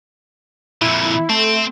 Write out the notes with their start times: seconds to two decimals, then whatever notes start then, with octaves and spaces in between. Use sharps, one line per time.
0.82 F2 A#2 E4
1.29 A3 C4